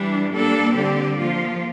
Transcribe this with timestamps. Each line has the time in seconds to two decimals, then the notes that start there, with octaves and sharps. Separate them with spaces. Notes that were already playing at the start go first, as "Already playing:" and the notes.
Already playing: E3 G3 D4
0.31 G3 A#3 D4 A4 D5
0.74 D3 G3 C4 G4 D5
1.18 F3 A#3 F4